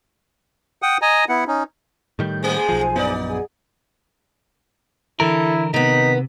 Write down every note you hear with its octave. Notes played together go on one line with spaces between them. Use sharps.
F#5 G5 D#6
D#5 G#5 A#5
B3 E4 F#5
C#4 D#4
A2 D#3 G3 G6
G#3 A3 G#4 C5 G#5
B1 F3
A#1 F#2 B3 D#4 B4 D5
G#4 F#5 G#5
D3 E3 E4 A4 A#4
C3 D#3 B3 D#4 B6